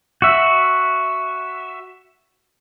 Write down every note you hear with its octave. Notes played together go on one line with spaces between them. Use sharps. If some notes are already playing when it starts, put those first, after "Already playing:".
F#4 E5